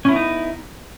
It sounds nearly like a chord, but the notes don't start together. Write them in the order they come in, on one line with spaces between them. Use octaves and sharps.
C#4 E4 B3 D#4